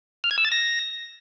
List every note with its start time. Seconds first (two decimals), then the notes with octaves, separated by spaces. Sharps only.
0.24 F6
0.31 G#6
0.38 E6
0.45 A6
0.52 A#6